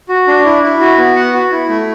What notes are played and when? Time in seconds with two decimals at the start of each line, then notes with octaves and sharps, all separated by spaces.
0.09 F#4
0.28 D4
0.45 E4
0.63 E4
0.80 F#4
0.98 B3
1.16 F#5
1.33 F#4
1.51 E4
1.69 A3